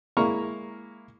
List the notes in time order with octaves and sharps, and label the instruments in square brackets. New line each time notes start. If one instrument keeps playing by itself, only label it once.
[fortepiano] G#3 A#3 E4 A#5 C#6 F6